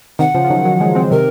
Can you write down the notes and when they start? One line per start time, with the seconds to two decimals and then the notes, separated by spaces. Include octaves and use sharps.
0.19 C3 D#3 F#5
0.34 C#3 F3
0.45 F3
0.50 D#3 F#3
0.65 D#3 F#3
0.80 F3 G#3
0.95 G#3 C4
1.11 C3 D#3 A#4